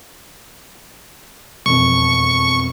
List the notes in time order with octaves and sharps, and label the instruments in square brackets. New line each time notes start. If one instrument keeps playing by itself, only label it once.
[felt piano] E1 F2 [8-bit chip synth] C#6